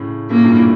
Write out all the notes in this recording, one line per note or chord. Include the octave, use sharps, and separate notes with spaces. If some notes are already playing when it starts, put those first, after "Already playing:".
Already playing: A2 C#3
A2 C#3 A#3
G2 A#2
A2